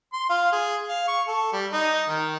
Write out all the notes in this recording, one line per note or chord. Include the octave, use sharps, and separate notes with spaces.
C6
F4
G#4
F5
C#6
A4
G3
D#4
D#3